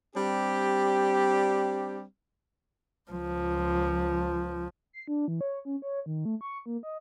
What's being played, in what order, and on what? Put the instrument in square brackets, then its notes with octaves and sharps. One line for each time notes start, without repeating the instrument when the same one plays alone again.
[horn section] G3 C4 D4 G4
[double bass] C#2 F3
[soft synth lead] C7
D4
E3
C#5
C#4
C#5
D#3
A3
C#6
A#3
D#5